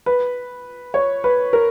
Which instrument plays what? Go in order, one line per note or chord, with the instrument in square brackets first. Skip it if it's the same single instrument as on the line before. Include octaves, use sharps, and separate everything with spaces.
[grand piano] B4
C#5
B4
A#4